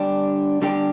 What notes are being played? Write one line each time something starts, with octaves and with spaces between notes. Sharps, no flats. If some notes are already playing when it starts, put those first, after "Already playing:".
Already playing: D3 G3 D4 G4
D3 G3 D4 G4